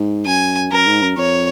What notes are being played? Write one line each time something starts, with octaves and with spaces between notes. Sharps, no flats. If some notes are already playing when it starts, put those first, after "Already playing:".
Already playing: G#2
F#2 G#5
F#2 A#4
G#2
F#2
F2 C#5